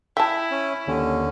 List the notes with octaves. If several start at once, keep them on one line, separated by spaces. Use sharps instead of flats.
E4 E5 G5 A5
C#4
D#2 D3 C#4